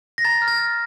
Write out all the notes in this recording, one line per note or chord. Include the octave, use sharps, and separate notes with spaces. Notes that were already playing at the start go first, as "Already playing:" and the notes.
A#6
A#5 A6
F6
A6
F6